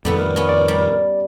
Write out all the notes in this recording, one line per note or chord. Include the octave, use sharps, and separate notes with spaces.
F2 A2 D#3 G3 B3 A4 B4
A#4
B3 C#4
D5
G3